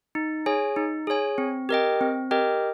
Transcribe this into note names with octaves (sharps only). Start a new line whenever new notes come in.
D#4
G#4 C#5 G#5
D#4
G#4 C#5 G#5
C4
G4 A#4 D#5 G5
C4
G4 A#4 D#5 G5